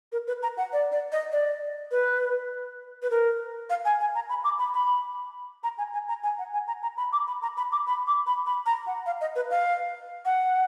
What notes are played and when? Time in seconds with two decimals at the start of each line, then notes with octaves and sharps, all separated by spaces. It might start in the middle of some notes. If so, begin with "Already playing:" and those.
0.12 A#4
0.27 B4
0.43 A#5
0.57 F#5
0.73 D5
0.92 D5
1.12 D#5
1.32 D5
1.91 B4
3.03 B4
3.10 A#4
3.70 F5
3.85 G#5
4.00 G#5
4.15 A#5
4.29 B5
4.44 D6
4.59 B5
4.74 B5
5.64 A#5
5.78 G#5
5.93 G#5
6.09 A#5
6.23 G#5
6.39 F#5
6.53 G#5
6.67 A#5
6.82 A#5
6.97 B5
7.13 D6
7.27 B5
7.42 A#5
7.57 B5
7.72 D6
7.87 B5
8.07 D6
8.27 B5
8.46 B5
8.66 A#5
8.87 F#5
9.06 F5
9.21 D#5
9.36 B4
9.51 F5
10.25 F#5